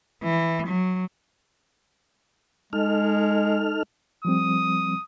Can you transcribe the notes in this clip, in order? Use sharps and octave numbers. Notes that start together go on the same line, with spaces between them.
E3
F#3
G#3 D#4 A4 F6
F3 G3 C4 D#6